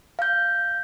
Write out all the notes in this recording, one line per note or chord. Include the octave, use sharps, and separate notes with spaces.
F5 G6